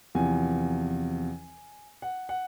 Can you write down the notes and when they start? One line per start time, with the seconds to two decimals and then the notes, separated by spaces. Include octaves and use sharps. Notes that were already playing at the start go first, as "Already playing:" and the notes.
0.15 E2 C3 F3 G#5
2.02 F#5
2.29 F#5